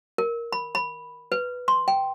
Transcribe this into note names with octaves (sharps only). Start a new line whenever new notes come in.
A#4
B5
B5
B4
C6
G5